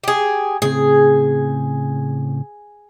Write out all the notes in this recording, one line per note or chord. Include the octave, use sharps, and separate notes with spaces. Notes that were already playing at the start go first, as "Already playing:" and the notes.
G4 G#4
A2 C#3 C4 G#4